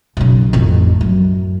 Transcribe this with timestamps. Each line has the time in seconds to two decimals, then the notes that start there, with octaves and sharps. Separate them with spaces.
0.17 B1 C#3
0.53 A1 F2
1.01 F#2